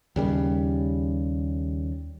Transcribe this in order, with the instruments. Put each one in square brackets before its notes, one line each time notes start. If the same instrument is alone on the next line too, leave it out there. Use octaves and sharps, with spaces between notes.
[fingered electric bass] D#2 C#3 G3